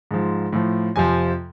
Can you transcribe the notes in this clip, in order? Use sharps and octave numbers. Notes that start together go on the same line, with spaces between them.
G#2 F3
A2 F3
F2 C3 F3 G#5